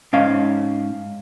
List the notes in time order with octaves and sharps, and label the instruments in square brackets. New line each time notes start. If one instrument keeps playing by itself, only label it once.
[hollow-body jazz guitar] G#2 C#4 F5